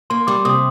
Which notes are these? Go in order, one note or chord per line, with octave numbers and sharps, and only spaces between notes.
A#3 C6
G3 D6
C3 D#6